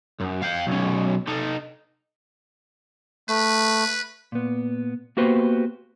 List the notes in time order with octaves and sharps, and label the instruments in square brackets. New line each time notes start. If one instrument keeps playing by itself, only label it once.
[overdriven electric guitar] F#2
F5 G5
B1 C#4
D#4 A4
[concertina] A3 [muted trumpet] B4
[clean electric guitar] A#2 B3
A#3 B3 F#4 G4 B4 C5